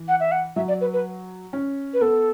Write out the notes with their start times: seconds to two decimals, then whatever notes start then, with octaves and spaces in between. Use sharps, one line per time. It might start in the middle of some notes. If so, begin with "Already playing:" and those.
Already playing: E3
0.08 F#5
0.20 E5
0.32 F#5
0.56 F#3 E5
0.68 D5
0.81 B4
0.93 B4
1.53 C#4
1.94 B4
2.01 B3 A4